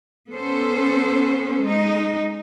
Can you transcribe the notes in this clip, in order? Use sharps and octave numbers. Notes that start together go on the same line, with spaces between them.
B3 C#4 A4 C5
G#3 D#4